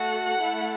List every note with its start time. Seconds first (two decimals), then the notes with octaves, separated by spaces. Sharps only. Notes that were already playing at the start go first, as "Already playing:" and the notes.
Already playing: A3 F#4 A4 F#5
0.38 A3 E4 A4